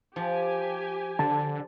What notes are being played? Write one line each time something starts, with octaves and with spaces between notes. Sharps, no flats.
F3 G4 G#5
D3 A5